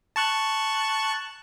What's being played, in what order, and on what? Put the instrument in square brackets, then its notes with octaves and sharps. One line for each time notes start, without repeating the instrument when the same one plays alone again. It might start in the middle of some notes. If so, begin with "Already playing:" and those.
[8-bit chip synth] A5 C#6 F#6